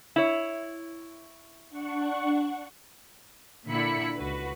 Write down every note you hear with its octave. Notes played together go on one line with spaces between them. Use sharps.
E4 C#5
D4 F#5 C#6
A#2 D3 E4 B5 C#7
C#2 F#4 B4